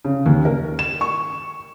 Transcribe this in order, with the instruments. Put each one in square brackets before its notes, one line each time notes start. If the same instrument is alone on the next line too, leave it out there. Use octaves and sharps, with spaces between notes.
[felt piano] C#3
D#2
A#4
E7
C#6